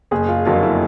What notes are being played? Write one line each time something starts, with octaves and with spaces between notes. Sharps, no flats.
F#1 G#4
F4
F2 D3 F#3 A#3 F4
E4